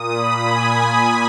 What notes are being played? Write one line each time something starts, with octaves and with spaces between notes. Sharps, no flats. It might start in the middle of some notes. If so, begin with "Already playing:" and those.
Already playing: A#2 D#6
B5
G#5